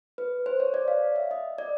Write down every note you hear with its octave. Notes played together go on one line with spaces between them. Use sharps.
B4
C5
C#5
D5
F5
E5
D#5
D5